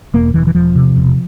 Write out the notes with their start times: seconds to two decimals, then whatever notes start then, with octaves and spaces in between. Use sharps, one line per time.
0.14 E1 A#3
0.34 E1 E3
0.47 E3
0.55 E1 F3
0.76 C3
0.96 E1